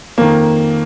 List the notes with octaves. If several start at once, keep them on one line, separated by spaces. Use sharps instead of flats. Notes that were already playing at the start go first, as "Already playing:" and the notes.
F2 D#3 A#3